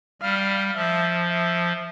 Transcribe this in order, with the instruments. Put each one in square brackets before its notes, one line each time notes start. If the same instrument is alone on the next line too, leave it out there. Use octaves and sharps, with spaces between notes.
[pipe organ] G3 [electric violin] F5
[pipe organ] F3 [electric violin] E5
[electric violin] E5